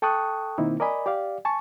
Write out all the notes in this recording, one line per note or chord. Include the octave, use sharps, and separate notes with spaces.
A4 G5 A5 C#6 D#6 F#6
B2 D#3 A#3 C4 D#4 E4
A#4 D5 D#5 G#5 B5
G4 D5 F5
G#5 A5 C#6